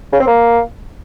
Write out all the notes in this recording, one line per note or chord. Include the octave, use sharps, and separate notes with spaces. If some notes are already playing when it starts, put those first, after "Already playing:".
C#3
C4
A#3